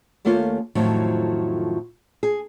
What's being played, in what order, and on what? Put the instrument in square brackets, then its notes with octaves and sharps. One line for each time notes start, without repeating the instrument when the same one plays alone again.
[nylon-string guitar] D#2 A3 A#3 C#4 F4
F2 A2 D#3 F3 F#3
G#4